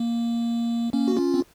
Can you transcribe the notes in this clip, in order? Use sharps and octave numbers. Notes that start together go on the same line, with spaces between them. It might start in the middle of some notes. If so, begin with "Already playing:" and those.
Already playing: A#3
A#3 C#4
F#4
C#4 F4
C4